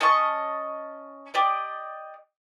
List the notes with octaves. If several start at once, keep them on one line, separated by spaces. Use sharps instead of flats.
C#4 D#5 A5 C#6
G4 D5 D#5